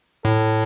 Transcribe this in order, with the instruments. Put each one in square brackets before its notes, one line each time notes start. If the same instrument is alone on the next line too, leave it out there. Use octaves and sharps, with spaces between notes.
[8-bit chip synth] A2 [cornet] A4